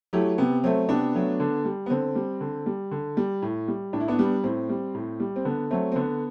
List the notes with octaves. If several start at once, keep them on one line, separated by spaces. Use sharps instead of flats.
F#3 A3 E4 G4
C3 B3
F#3 A3 C4
C3 B3 D4
F#3 A3
D3
G3
B3
D3 C4
G3
D3
G3
D3
G3
A2
G3
A2 D4
E4
B3 D4
G3
A2 C4
G3
A2
G3
C4
D3 B3
F#3 A3 C4
C4
D3 B3